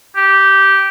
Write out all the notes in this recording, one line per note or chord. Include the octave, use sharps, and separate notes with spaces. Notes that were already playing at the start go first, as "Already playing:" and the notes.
G4